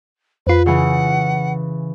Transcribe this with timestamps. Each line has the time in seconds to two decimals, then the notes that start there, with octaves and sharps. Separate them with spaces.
0.47 F2 F4 B4
0.66 C#3 E3 F#5